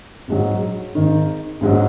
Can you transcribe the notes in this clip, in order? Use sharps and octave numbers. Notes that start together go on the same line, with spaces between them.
A#1 G#2 F#3
G#1 G#2 D#3
A#1 G#2 F#3